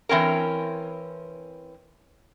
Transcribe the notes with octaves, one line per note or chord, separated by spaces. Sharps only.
E3 C4 C#4 A#4